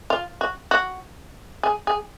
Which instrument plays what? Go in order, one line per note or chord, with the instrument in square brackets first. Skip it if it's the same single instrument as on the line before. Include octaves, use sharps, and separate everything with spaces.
[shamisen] F4
F#4
F#4
G#4
G#4